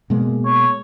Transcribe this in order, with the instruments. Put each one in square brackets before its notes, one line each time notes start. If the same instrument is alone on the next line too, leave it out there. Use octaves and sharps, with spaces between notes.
[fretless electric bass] B2 G#3 A#3
[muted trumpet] C#5